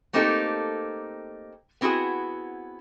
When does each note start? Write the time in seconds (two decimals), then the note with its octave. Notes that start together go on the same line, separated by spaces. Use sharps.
0.13 A3 A#3 C4 D#4 G4 A4
1.81 B3 C4 E4 F#4 G#4